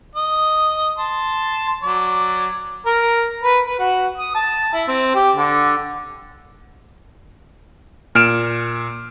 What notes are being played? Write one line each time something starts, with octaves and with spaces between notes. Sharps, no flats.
D#5
A5 C6
F#3 D5
A#4
B4
B4
F#4
D#6
A5
E4
C4
G4
D3
A#2 F6 D7 E7